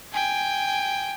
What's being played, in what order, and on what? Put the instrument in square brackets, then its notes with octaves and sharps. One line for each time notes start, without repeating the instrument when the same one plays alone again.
[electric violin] G5 G#5